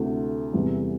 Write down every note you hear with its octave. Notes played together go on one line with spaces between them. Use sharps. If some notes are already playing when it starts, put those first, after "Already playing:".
Already playing: D2 C3 A3 E4 A4
E2 C3 E3 G3